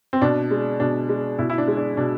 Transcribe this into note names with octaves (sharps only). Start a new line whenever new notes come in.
C4
B2 D4
G#3
B2 D4
G#3
B2 E4
E4
D4
G#3
D4
B2 D4